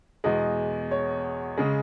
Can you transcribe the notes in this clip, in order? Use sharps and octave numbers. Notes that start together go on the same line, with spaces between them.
E2 B2 G#3 D#5
C#5
C#3 G#3